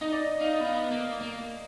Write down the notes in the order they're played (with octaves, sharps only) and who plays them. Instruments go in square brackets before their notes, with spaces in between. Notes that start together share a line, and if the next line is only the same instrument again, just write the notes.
[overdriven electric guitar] D#4 [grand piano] D#5
[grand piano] D5
D#5
[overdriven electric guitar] D#4 [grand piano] F5
[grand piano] D#5
[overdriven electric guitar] B3 [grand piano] F5
[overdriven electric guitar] A#3
A#3